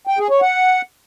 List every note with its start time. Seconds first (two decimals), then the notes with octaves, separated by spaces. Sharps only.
0.07 G5
0.19 G#4
0.30 C#5
0.41 F#5